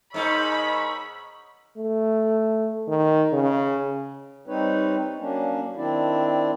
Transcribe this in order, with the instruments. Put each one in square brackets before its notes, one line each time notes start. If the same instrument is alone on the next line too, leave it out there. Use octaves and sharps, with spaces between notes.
[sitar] G#2 D#4 [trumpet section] A#4 C#5 D#5 [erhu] B5 [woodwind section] C#6 E6
[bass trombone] A3
D#3
C#3
[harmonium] G3 C4 D#4 B4 C#5
F#3 A#3 C#4 D4
D#3 C4 D4 E4 D5